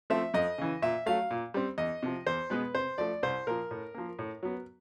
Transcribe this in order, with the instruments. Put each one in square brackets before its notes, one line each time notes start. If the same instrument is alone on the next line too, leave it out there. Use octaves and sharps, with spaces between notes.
[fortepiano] F3 A3 C4 E5
F2 D#5
C#3 E3
A#2 E5
F#3 A3 F5
A#2
G3 C4
E2 D#5
C3 F3
E2 C5
B2 G#3 B3 B4
C3 C5
F3 A3 D5
C2 C5
A#2 F3 A#4
A2
F3 A#3
A2
F#3 B3